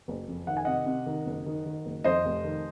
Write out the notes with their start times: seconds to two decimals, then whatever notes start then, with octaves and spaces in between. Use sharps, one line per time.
0.08 F#1
0.28 F2
0.47 D#3 F#5
0.57 G#5
0.65 C3 D#5 F#5
0.86 C3
1.06 D#3
1.26 F#1
1.46 D#3
1.66 D#3
1.85 F#1
2.04 F2 C5 D#5
2.25 F1
2.44 D#3